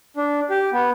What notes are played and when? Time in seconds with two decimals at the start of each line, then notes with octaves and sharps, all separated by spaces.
0.17 D4
0.50 G4
0.73 B3